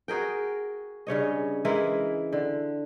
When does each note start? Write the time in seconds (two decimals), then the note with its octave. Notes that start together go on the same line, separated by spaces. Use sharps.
0.08 F#4 G#4 A#4 G5
1.07 G2 C#3 C#5 D#5
1.65 E3 G#3 E4 A#4
2.33 D3